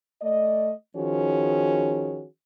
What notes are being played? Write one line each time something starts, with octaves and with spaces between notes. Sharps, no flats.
A3 D5 D#5
D#3 F3 C#4 F#4 G#4